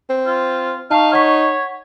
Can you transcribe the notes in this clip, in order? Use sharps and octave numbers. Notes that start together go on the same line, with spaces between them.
C4
F4
D#4 F5 A5 C#6
C#5 F#5 C#6 B6